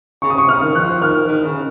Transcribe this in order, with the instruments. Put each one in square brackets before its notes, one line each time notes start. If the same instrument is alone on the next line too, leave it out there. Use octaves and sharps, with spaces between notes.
[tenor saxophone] C#3 [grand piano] C#6
[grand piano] D#6
[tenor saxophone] C3 [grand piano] C#6
[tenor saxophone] C#3 [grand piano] F6
[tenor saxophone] D#3
[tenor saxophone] F3 [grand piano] F#6
[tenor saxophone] D#3 [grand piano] F6
[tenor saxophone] D#3
C#3